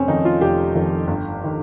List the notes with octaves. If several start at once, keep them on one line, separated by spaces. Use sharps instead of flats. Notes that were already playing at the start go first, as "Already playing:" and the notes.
Already playing: F1 C4 C#4
F2 D#3 D#4
F4
F1 G4
F2 D#3
G1
D#3